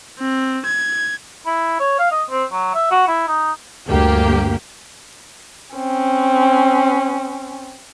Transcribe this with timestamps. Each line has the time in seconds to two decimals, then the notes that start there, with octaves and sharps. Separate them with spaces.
0.19 C4
0.65 G#6
1.46 E4
1.80 C#5
1.99 F5
2.11 D#5
2.30 C4
2.52 F#3
2.74 E5
2.91 F#4
3.08 E4
3.28 D#4
3.87 D2 G2 A#3 G4
5.76 C4 C#4